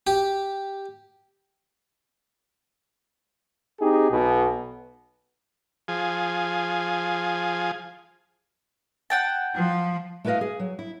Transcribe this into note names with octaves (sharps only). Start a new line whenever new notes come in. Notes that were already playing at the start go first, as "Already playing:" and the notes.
G4
C4 D#4 G4 G#4
B1 B2
F3 G#4
F#5 G5 A5
F3
A3 E4 B4 C#5 D#5 F5
G#4
F#3
E4